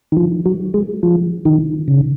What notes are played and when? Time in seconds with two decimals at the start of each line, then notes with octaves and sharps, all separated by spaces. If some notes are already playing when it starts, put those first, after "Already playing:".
0.12 D#3
0.17 F3
0.46 F#3
0.74 G#3
1.03 F3
1.45 D#3
1.88 C#3